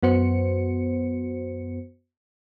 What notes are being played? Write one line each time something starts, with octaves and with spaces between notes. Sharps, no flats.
F#2 B3 F#4 C5 C#7